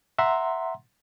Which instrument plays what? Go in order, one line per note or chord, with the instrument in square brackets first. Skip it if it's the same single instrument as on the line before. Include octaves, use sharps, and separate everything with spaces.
[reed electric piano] E5 F#5 A#5 C6